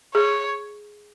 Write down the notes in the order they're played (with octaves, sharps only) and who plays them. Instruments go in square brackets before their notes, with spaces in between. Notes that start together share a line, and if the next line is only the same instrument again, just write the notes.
[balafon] G#4 [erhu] C#5